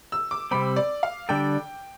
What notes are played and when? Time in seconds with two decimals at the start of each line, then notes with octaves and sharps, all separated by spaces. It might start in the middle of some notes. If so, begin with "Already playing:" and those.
0.12 E6
0.31 D6
0.51 C3 G3 C4 B5
0.76 D5
1.03 F5
1.29 D3 G3 D4 A4 G5